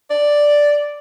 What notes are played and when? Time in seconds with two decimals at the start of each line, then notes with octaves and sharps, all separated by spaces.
0.10 D5